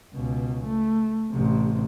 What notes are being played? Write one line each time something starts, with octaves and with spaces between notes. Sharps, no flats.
C#2 B2
A3
A1 C3